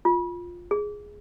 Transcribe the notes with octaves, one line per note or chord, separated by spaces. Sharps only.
F4
G#4